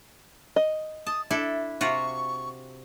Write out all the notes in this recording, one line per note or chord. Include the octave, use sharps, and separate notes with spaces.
D#5
A5 D#6
D4 E4 A4 E5
C3 F4 F#4 C#6